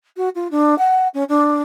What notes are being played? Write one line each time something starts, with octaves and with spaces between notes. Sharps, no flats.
F#4
F4
D4
F#5
C#4
D4